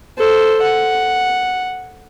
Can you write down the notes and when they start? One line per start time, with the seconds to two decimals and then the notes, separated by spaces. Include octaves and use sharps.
0.18 A4 C5
0.62 F#5